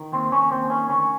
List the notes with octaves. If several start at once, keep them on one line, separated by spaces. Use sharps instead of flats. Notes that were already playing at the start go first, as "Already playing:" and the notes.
Already playing: D#3
D#2 C4
D#2 C#4
D#2 C4
D#3 C#4
D2 C#4